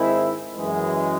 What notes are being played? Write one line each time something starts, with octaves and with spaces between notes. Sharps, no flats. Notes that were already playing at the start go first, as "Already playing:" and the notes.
Already playing: G#2 D#3 G#3 C4 E4
F#2 E3 G#3